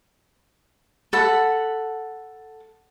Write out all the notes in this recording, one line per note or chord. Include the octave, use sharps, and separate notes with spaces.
A4 F#5 B5